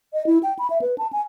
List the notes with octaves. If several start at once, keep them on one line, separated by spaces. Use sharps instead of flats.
D#5
E4
G5
B5
E5
B4
A5
G#5